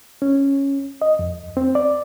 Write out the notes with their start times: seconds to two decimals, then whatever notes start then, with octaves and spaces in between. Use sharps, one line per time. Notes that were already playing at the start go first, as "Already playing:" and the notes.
0.22 C#4
1.02 D#5
1.19 F2
1.57 C4
1.75 D5